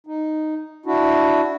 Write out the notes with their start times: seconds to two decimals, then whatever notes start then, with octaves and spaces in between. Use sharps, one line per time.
0.07 D#4
0.86 D4 E4 F#4